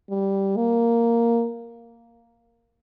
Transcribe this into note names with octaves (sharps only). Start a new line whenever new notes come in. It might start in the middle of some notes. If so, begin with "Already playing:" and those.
G3
A#3